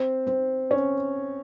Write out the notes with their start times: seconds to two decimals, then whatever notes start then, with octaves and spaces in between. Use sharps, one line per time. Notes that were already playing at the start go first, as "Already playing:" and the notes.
Already playing: C4 C5
0.27 C4 C5
0.71 C#4 C#5